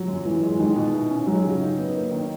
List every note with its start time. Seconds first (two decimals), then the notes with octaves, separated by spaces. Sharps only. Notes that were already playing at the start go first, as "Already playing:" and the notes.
Already playing: F#3
0.08 F#2
0.25 F#2 E3
0.42 G#3
0.59 D#3 G#3
0.76 B2
0.93 E4
1.11 C#4
1.27 F#3 G#3
1.44 C#3
1.61 D#4
1.78 B3
1.95 A#3
2.11 D#3